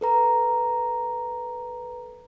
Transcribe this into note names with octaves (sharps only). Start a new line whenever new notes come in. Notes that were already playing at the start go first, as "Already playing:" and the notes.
A4 B4 A#5